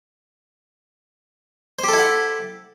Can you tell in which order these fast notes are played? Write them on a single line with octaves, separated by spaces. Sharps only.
C5 G4 A4 E4 F#5